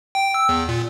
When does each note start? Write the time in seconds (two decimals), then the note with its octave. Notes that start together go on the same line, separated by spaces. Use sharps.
0.15 G5
0.34 E6
0.49 E2
0.69 A#2